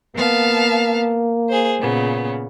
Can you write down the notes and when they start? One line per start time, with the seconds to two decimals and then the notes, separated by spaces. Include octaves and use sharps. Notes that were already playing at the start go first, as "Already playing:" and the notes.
0.16 A#3 B3 F5 A5
1.49 G#4 C5
1.80 A#2 C#3 B3